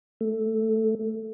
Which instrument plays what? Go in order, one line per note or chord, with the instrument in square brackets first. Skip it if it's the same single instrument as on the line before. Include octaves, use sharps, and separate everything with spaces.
[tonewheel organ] A3